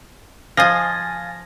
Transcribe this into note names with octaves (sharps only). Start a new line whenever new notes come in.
F3 D#5 F5 G#5 A6 A#6